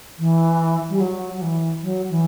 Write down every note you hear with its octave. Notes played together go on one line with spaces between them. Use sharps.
E3
G3
F#3
F#3
E3
F#3
E3